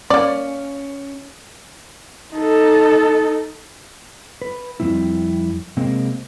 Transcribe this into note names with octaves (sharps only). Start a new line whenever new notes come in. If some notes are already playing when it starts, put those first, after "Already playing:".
A#3 C#4 D5
D#4 A4
B4
F2 C#3 G3 C4 E4
C3 G#3 A#3 C4